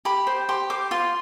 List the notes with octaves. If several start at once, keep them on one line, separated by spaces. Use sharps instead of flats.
G4 B5
C5
G4 C6
C5 D6
F4 C6